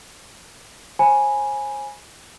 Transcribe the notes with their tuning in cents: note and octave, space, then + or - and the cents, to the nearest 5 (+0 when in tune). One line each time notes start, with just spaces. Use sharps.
C5 +40 G#5 +0 B5 -25